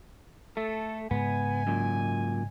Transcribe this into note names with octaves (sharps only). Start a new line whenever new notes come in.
A3 A4
G#2 C#3 G#3 B3 G#5
F#2 A#2